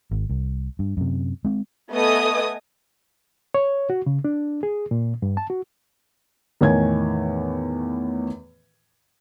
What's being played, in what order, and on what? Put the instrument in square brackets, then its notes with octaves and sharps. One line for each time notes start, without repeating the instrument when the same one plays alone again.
[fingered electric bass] G#1
C2
G2
F#2 C3
G#3 C4
[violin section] A3 B3 D#5 G#5 D#6
[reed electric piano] C#5
F#4
C#3
D4
G#4
A#2
G2
A5
F#4
[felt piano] E2 A2 D#3 C#5 G#5 G#6